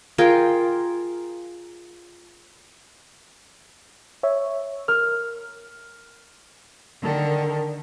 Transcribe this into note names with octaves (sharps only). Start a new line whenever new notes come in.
F4 G#4 A#4 G5
C#5 E5
A#4 F6
D3 D#3 A4 A#4